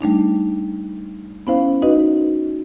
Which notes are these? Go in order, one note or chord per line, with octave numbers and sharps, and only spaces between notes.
G3 A3 D4 D#4
B3 C#4 E4 C5 F5
D#4 F#4 B4 D#5